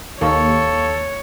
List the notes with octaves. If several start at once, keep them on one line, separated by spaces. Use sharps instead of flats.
D#2 A4 C#5 F5 C#6